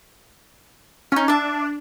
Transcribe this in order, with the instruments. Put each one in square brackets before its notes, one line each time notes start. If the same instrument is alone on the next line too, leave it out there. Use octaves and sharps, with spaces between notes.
[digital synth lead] C#4 [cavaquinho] D#4 F4
[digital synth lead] D4 [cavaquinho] E5 A5